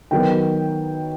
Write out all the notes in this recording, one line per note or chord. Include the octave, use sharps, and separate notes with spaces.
D#3 F#3 B3 G5